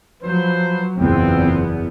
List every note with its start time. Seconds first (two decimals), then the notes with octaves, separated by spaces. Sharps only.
0.23 F3 F#3 B4 C5
0.97 F#1 E2 A#2 B3 C4